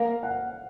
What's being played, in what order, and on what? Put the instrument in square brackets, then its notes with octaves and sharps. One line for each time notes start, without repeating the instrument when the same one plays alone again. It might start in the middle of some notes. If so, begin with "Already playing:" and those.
Already playing: [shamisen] A#3 [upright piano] F5
[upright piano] F#5